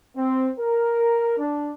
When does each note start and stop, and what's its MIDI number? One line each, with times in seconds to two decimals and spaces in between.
0.17 0.49 60
0.59 1.36 70
1.37 1.71 62